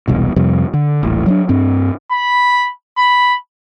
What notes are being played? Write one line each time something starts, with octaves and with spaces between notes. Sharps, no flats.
E1 C2 B2
F2 C3 F3 G3
D3
D#1 A1
F#3 G#3 D4
G2 C4
B5
B5